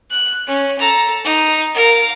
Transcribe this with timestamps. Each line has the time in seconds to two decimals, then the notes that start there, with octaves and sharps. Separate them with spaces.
0.10 F#6
0.47 C#4
0.78 A4 A#5
1.24 D#4
1.74 A#4 F5